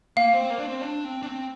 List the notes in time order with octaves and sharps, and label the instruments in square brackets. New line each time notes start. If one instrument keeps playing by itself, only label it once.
[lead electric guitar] A#3 [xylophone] F5
[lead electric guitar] C4
A#3
D4
C4
D4
C4
D4
C4